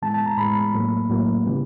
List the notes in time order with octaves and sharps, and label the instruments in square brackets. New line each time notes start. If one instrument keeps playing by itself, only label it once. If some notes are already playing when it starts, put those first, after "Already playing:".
[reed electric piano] A2 E3 G#3 B3 A5
A5
A#5
A2 E3 G#3 B3 B5
A2 F#3 A#3
A2 F#3 A#3
C#3 E3 G3 B3